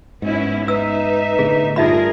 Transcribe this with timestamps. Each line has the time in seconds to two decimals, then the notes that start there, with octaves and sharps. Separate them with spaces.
0.22 G#2 B3 C#4 E4
0.68 D#4 B4 E5 E6
1.39 A2 D3 B3 G#4
1.76 G2 D#4 F4 G#4 A#4 E5 B5